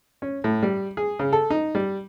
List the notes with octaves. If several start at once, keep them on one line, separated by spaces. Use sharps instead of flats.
C#4
A2
G3
G#4
C#3
A4
D#4
G3